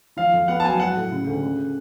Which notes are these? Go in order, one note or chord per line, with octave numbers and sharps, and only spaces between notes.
F3 F5
F2
B3 F#5
A5
F#3 G#5
F#3 F#5
A2
C#3
D2
C#3